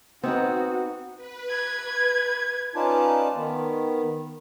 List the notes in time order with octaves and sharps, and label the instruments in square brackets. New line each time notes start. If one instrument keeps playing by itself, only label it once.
[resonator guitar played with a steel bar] B3 D#4 B4 [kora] C4 [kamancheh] F#4
[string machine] B4
[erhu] G#6
[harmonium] C#4 D#4 F4 B4 D5 A5
D#3 B3